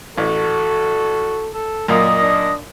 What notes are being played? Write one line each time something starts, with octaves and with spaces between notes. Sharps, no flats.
A1 F#4 A4
A4
F#2 A#2 D5 D#5 D#6
D4